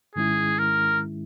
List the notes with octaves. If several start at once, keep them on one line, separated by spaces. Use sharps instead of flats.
G#2 D#3 G#3 C#4 E4 G#4
A#4